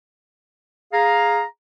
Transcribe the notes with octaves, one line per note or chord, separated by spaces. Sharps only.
G#4 F5 A#5